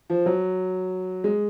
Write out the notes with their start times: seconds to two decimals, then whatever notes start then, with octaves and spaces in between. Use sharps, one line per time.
0.10 F3
0.26 F#3
1.24 G#3